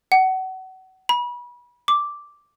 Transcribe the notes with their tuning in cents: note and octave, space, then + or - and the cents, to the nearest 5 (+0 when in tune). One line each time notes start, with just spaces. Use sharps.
F#5 +30
B5 -30
D6 -5